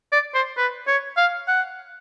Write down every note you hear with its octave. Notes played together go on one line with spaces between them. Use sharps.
D5
C5
B4
C#5
F5
F#5